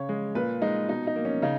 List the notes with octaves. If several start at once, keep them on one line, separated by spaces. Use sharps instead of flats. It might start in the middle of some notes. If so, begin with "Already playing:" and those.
Already playing: C#3 C#5
G#3
A#2 B4
G#3 D#4
B2 D#4
D#4
A#3
C#4
C#3 D#4